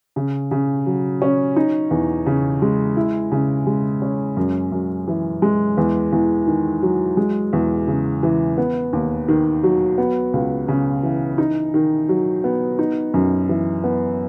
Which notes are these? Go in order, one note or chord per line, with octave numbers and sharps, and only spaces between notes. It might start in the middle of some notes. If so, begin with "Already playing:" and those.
C#3
C#3
F#3
C#4
D#4
E2
C#3
G#3
E4
C#3
G#3
C#4
F#2
F#2
E3
G#3
E2
E2
D#3
F#3
G#3
E2
C#3
E3
B3
D#2
D#3
F#3
B3
C#2
C#3
E3
D#4
D#3
F#3
B3
D#4
F#2
E3
B3